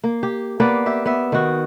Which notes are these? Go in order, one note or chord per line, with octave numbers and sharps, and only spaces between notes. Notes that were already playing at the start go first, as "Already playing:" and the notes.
A#3
G4
A#3 B3 B4 D5
G4 E5
B3 E5
D#3 F#4